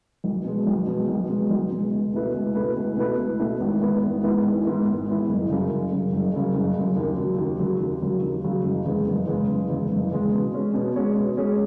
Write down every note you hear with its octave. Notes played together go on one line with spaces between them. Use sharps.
B1
B2 G#3
B1
B2 G#3
B1
B2 G#3
B1
B2 G#3
C#2
B2 A3 E4 B4
C#2
B2 A3 E4 B4
C#2
B2 A3 E4 B4
C#2
B2 A3 E4 B4
G#1
G#2 E3 B3 E4
G#1
G#2 E3 B3 E4
G#1
G#2 E3 B3 E4
G#1
G#2 E3 B3 E4
F#1
F#2 C#3
F#1
F#2 C#3
F#1
F#2 C#3
F#1
F#2 C#3
D#2
C#3 F#3
D#2
C#3 F#3
D#2
C#3 F#3
D#2
C#3 F#3
F#1
E2 C#3 G#3
F#1
E2 C#3 G#3
F#1
E2 C#3 G#3
F#1
E2 C#3 G#3
B2
G#3 C#4 G#4 C#5
B2
G#3 C#4 G#4 C#5
B2
G#3 C#4 G#4 C#5